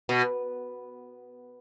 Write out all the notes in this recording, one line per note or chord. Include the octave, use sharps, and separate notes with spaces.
B2